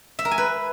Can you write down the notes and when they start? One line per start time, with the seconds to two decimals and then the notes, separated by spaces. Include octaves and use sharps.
0.19 E5
0.25 A#4
0.31 G#5
0.38 B4